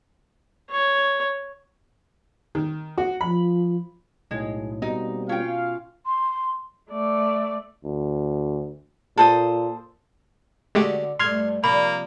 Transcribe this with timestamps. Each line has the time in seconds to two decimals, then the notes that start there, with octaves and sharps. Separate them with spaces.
0.71 C#5
2.55 D#3
2.98 F#4
3.21 F3 B5
4.31 B1 A2 G#3
4.82 B2 G3 A#3 C4 D#4
5.29 C#4 F4 F5 G5
6.06 C6
6.91 A3 D5
7.84 D2
9.18 A#2 A4 C5 D#6
10.75 D3 G#3 A3 F#4 G4
11.19 G2 G3 A3 C6 F6 G#6
11.64 C3 F3 A#3 D5 B5